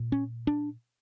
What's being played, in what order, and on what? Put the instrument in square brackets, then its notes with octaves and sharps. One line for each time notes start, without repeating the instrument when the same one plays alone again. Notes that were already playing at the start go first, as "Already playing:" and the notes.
Already playing: [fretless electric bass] A#2
C#4
D4